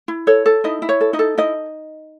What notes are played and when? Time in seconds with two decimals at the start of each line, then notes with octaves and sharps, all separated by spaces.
0.08 E4
0.27 A4 C#5
0.46 A4
0.64 D#4 E4 D#5
0.82 E4
0.89 C#5
1.01 A4
1.13 D#4 D#5
1.19 A4
1.38 D#4 E4 D#5